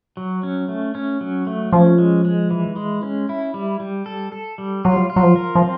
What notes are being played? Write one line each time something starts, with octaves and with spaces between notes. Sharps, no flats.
F#3
C#4
A3
C#4
F#3
A3
F3 C#4
G#3
G#3
E3
G#3
C#4
E4
G3
G3
A4
A4
G3
F#3 F4
F4
F#3
F3
A#4
F3
C4